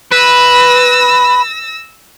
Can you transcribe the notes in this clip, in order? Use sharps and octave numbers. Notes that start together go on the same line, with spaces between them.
B4 E6 A#6